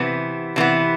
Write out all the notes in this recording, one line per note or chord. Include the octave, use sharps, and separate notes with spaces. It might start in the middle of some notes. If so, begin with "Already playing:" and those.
Already playing: C3 E3 B3
C3 E3 B3